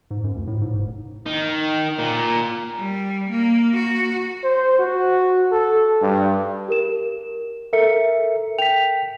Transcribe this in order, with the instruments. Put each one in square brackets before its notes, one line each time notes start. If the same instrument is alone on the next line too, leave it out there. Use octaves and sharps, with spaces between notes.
[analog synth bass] G#2
F#2
D2
A2
G#2
F1
[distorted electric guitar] D#3
A#2
[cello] G3
A#3
F#4
[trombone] C5
F#4
A4
G2
[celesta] G4 A#4 E7
[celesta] A4 C#7 [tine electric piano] A#4 E5
[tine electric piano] G5 B6 [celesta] F7